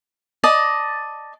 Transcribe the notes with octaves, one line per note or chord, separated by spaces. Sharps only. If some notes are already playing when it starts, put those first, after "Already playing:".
D5 D#5 A5